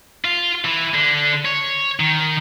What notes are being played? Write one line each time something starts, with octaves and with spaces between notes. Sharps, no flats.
F4
E3
D3
C#5
D#3